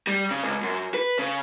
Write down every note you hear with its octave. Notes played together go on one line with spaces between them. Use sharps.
G3
C#3
C#2
F#2
B4
C#3